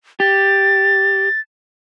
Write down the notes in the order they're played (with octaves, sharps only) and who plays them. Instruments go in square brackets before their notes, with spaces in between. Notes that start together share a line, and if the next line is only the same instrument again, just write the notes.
[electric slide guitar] G4 [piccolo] A6